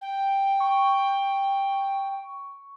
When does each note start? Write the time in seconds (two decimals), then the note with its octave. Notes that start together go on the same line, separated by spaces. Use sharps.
0.01 G5
0.60 C#6